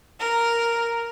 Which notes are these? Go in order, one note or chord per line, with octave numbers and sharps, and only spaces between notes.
A#4